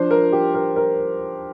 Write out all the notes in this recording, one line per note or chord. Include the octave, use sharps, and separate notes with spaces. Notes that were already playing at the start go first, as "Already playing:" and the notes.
Already playing: F3 D4 F4 C5
A#4
G4
A#4
A#4